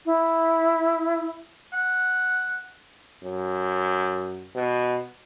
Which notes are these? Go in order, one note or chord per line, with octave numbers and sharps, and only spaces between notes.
E4
F#5
F#2
B2